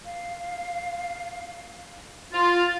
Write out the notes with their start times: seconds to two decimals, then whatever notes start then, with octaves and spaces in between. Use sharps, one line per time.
0.06 F5
2.33 F4 A6